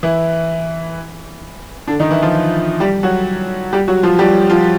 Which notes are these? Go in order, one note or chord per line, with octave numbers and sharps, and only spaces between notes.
E3 E4
D3 D4
D#3 D#4
E3 E4
F3 F4
G3 G4
F#3 F#4
G3 G4
F#3 F#4
F3 F4
G3 G4
F3 F4